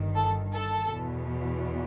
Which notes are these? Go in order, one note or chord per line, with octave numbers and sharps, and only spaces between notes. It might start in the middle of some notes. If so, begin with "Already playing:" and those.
Already playing: G1 G2 D#3
A4
A4
E2 B2